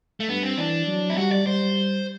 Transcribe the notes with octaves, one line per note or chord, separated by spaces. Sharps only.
A3
G2 B3
C4
E3 D4
F#3
E4
G3 F#4
D5
G3 C5